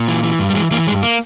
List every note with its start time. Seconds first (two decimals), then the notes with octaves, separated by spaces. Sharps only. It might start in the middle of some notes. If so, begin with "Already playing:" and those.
Already playing: A#2
0.08 E3
0.23 E3
0.39 G2
0.50 G3
0.55 E3 G#3
0.71 E3 A#3
0.87 G2 G#3
1.03 A#3